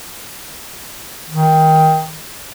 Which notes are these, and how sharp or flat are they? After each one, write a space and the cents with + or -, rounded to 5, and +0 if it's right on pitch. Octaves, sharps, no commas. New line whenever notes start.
D#3 +20